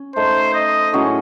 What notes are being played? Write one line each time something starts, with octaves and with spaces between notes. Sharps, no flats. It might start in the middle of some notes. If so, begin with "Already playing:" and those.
Already playing: C#4
A3 D#4 A4 C5 C#5
D#5
A2 F#3 C#4 G#4